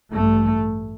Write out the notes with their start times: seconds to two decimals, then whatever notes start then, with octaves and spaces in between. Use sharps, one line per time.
0.12 A1 G2 A3